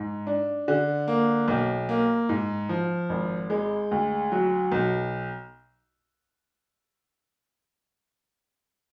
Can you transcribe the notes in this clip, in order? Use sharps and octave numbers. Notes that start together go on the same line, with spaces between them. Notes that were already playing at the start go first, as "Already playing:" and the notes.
Already playing: G#2
D4
D3
A#3
B1
A#3
G#2
F3
G#1
G#3
D2
F#3
B1